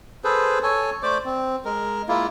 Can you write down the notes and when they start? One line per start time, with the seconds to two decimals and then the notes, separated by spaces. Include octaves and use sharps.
0.24 G#4 A4 B4 C5
0.63 A4 C#5 G#5
1.03 A3 C5 D5 D6
1.25 C4
1.65 G#3 A#4
2.08 G#3 A#3 E4 F4